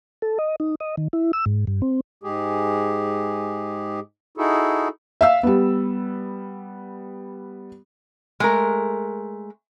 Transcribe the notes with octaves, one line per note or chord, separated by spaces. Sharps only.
A4
D#5
D#4
D#5
D#3
E4
E6
G#2
G2
C4
G#2 G#3 G4 G#4
D#4 E4 F#4 G#4 A4
E5 F5 E6
G3 B3
G#3 A3 A#4